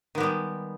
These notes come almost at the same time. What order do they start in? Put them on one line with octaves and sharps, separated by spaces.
D#3 B3 G3 G#3